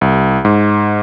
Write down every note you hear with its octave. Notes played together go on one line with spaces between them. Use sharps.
C2
G#2